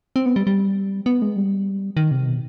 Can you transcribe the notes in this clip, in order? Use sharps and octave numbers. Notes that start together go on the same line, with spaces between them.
C4
B3
G3
G3
B3
G#3
G3
D#3
C3
B2